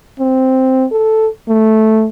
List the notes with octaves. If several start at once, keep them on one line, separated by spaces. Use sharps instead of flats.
C4
A4
A3